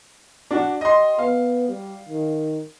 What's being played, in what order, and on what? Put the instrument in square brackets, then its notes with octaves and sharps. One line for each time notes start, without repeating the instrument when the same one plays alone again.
[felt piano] D4 F#4
[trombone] G4 [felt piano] D#5 C6
[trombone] B3 [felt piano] F5
[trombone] G3
D#3